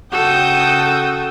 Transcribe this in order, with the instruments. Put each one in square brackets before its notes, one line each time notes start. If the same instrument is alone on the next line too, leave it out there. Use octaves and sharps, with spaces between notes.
[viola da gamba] C#3 A4 [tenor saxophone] F#4 [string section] G5 D#6 G6